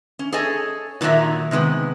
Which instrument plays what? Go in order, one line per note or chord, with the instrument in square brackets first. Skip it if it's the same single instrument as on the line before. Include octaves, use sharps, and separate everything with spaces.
[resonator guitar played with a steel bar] C#4
G#4 A4 C#5 D#5 G#5
A#2 D#3 F#3 D4 A#4 E5
C3 D#3 G#3 B3